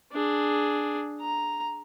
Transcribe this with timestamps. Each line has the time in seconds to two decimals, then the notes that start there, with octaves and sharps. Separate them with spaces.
0.13 D4 G#4
1.21 A#5